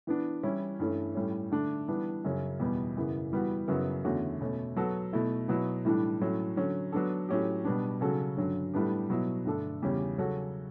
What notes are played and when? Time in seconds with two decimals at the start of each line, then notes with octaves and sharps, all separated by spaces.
0.07 E3 B3 D4
0.43 E3 G3 C#4 E4
0.79 G2 E3 A3 C#4
1.15 A2 G3 C#4
1.52 D3 A3 D4
1.88 E3 G3 B3 D4
2.24 F#2 C#3 F#3 C#4
2.60 E2 B2 G3 B3
2.97 F#2 C#3 E3 B3
3.32 E3 G3 B3 F#4
3.68 F#2 C#3 F#3 B3 E4
4.05 E2 D3 A3 C#4 F#4
4.41 B2 A3 C#4
4.76 F#3 B3 F#4 A4
5.13 B2 A3 E4
5.48 B2 F#3 B3 E4
5.85 A2 E3 G3 D4
6.21 A2 F#3 C#4
6.57 D3 F#3 C#4
6.93 F#3 B3 D4 A4
7.29 A2 F#3 C#4 G4
7.65 B2 G3 B3 D4
8.01 C#3 F#3 C#4 F#4 A4
8.37 G2 D3 F#3 C#4
8.74 A2 G3 B3 D4 G4
9.10 B2 F#3 B3 E4
9.45 G2 D3 A3 D4 A4
9.82 E2 C#3 G3 C#4 G4
10.18 C#3 F#3 C#4 F#4 A4